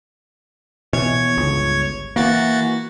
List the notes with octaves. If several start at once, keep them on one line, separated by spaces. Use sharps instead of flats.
B2 E3 C#5 G#6
G1 C#2
E3 A#3 F#4 A6